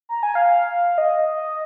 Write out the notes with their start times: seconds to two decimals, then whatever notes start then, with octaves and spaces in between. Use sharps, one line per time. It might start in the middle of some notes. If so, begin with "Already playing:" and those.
0.09 A#5
0.23 G#5
0.35 F5
0.98 D#5